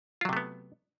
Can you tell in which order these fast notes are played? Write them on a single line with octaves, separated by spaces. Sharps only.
F4 F#3 C3 A3 B3